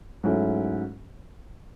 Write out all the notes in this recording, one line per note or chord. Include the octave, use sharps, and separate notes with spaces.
G#2 F#3 A3 C#4 E4